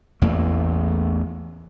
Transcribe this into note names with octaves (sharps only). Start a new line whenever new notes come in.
A1 E2 A3 A#3